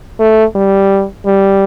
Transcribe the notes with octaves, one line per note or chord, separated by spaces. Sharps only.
A3
G3
G3